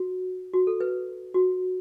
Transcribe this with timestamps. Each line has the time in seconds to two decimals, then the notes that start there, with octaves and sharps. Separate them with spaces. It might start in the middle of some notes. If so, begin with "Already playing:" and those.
Already playing: F#4
0.53 F#4
0.67 A4
0.80 B4
1.34 F#4